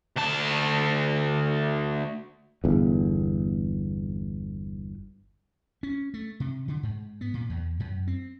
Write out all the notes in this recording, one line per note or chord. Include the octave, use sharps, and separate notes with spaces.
D2 A5
G1 E2
C#4
A3
C3
D3
G#2
B3
A#2
E2
F#2
C4